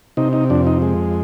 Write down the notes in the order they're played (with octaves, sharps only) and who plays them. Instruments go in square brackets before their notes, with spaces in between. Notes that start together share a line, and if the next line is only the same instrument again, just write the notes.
[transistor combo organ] C3 D#4
D#4
F2 D4
D#4
G#3